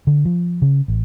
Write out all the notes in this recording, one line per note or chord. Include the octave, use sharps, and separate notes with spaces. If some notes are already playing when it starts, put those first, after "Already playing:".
D3
F3
C#3
A1